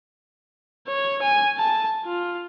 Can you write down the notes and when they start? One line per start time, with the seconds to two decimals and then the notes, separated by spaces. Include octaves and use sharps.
0.88 C#5
1.22 G#5
1.58 A5
2.05 F4